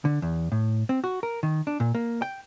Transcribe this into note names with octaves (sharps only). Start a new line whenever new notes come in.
D3
E2
A2
C4
F#4
A#4
D#3
D4
A#2
A#3
G5